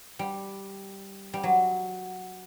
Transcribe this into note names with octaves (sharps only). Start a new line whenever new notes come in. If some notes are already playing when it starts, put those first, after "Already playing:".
G3
G3
F#3